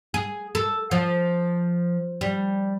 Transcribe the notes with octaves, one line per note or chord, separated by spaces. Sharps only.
G#4
A4
F3
G3